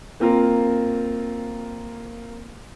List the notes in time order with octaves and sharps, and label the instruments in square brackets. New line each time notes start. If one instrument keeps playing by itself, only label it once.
[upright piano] A#3 C4 F4 A#4